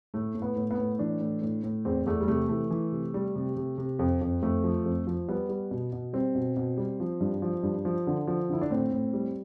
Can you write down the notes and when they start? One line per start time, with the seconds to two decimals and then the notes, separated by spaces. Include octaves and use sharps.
0.14 A2 A3
0.35 A2
0.42 B3
0.56 A2
0.71 B3
0.78 A2
0.99 E3 D4
1.21 A2
1.42 A2
1.64 A2
1.85 E2 C4
2.06 E2 A3
2.21 G3
2.28 C3 A3
2.49 E3 A3
2.70 E3
2.92 C3
3.14 G3
3.36 C3
3.57 C3
3.78 C3
3.99 F2
4.21 F2
4.42 F2 A3
4.64 F3
4.85 F2
5.07 F3
5.28 G3 B3
5.49 G3
5.71 B2
5.92 B2
6.13 G3 C4
6.35 B2
6.57 B2
6.77 G3
7.00 F3
7.21 G2
7.42 F3
7.63 G2
7.85 F3
8.07 D3
8.27 F3
8.49 D3 E4
8.61 D4
8.70 A2 C4
8.92 A2
9.13 G3